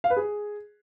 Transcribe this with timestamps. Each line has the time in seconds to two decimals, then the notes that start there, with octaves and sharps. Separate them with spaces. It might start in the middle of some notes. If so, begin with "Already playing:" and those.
0.04 F5
0.10 B4
0.17 G#4